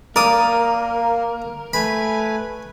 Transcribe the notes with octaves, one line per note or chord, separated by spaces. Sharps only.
A#3 A#4 D5 D#6
A3 B4 G#5 B5